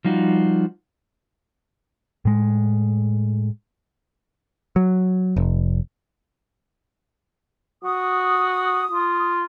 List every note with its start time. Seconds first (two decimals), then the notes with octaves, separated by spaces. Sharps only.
0.05 F3 G3 D#4 F4 F#4
2.25 A2 G#3
4.76 F#3
5.36 F1
7.84 F#4 D#6
8.91 F4